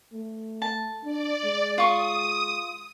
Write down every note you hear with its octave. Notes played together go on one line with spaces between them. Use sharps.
A3
A5
D4 D5
G#3
F4 C#6 D#6